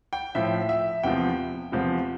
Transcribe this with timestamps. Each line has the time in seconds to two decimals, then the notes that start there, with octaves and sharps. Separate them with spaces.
0.13 G5
0.35 A2 F3 E5
0.69 E5
1.03 E2 C3 F3 G5
1.72 E2 C3 F3